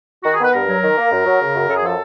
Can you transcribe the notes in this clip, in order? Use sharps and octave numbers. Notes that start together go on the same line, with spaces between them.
D#3 F#4
G#4
B3 B4
G2 A#4
F#3
D#3
A#3
F#2
F#3
C#3
F#2
F#2 A4
G#4
F3 A4